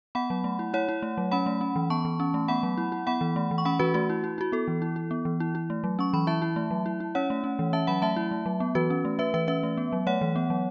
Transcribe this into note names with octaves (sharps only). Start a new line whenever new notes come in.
B3 F#5 B5
F#3
A3
E4
E4 C#5 F#5
E4
A3
F#3
C#4 F#5 B5
A3
C#4
E3
B3 A5 C#6
E3
C#4
A3
B3 F#5 B5
F#3
E4
E4
B3 F#5 B5
E3
A3
E3
C#6
C#4 F#5 B5
E3 F#4 B4
A3 F#4
E4
E4
E4 F#4
B3 A4
E3
E4
E4
B3
E3
E4
E4
A3
F#3
C#4 C#6
E3 B5
E4 E5 A5
E4
A3
F#3
E4
E4
C#4 C#5 F#5
A3
C#4
E3
C#4 E5 A5
F#3 F#5 B5
A3 E5 A5
E4
A3
F#3
B3
E3 F#4 B4
C#4
A3
A3 B4 E5
E3 B4 E5
C#4 B4 E5
A3
B3
F#3
A3 C#5 F#5
E3
B3
F#3